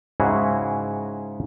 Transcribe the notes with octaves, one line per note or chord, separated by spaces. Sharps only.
G#2 C#3 E4 F#4 G#4